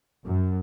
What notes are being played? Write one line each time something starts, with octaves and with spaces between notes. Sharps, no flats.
F#2